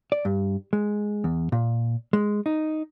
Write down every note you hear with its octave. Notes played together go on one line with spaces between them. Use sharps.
D5
G2
G#3
E2
A#2
G#3
D#4